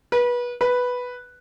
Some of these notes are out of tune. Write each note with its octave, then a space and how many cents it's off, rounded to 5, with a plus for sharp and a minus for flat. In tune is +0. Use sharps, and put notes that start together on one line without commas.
B4 -25
B4 +0